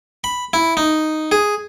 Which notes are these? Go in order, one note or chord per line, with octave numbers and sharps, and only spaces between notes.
B5
E4
D#4
G#4